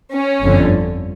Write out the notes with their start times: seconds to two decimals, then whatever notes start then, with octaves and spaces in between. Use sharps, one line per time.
0.15 C#4
0.42 G1 F2 D3